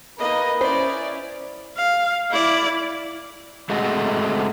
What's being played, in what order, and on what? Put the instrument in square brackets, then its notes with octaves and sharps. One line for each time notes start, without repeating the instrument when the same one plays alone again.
[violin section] A#3 D#4 [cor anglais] B4 [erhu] D#5
[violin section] C#4 E4 [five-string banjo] C5 [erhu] D5
[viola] F5
E4 D5
[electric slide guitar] G#3 A3 C4 F#4 G#4 D#5